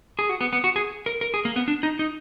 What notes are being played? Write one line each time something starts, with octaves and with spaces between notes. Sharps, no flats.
G#4
F#4
B3
B3
F#4
G#4
A#4
A#4
G#4
A#3
B3
D4
D#4
D#4